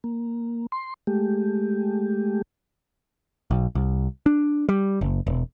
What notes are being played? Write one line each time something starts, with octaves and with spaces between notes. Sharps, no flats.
A#3
C6
G#3 A3 G4
B1
C2
D4
G3
F#1
E1